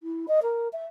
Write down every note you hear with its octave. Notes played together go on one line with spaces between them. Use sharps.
E4
D#5
A#4
E5